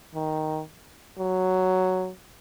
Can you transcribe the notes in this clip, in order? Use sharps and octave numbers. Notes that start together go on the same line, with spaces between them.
D#3
F#3